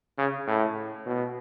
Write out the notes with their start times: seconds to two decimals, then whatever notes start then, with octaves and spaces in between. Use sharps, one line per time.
0.18 C#3
0.47 A2
1.06 B2